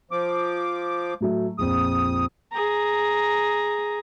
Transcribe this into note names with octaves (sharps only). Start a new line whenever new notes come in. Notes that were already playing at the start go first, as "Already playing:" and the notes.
F3 D6
A2 F#3 A3
A#1 F2 D#6
G#4 A#5